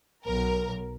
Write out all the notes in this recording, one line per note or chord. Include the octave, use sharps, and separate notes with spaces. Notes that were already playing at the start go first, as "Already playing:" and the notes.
B1 A#4